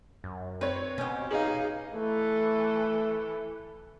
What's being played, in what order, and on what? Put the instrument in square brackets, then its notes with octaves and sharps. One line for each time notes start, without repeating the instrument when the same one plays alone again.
[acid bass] F#2
[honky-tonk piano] C4 C#5 [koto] B4
[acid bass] B2 [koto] C#4 G4
[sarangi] D#4 [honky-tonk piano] G#4 F5
[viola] E3 A4 [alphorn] A3